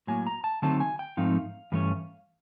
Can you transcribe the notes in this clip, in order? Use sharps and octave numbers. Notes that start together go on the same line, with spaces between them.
A2 F#3 A#3 G#5
A#5
A5
D3 F#3 A3 C4 D#4 A5
G#5
G5
G#2 F3 A3 C4 D#4 F5
G2 E3 A3 C#4